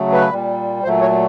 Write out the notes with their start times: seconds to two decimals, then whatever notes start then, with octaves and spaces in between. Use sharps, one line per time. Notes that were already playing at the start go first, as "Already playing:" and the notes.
Already playing: C#3 F#3 A3
0.12 B4
0.30 A#2 G3
0.83 A#2 F#3 A3 C5
1.01 C#5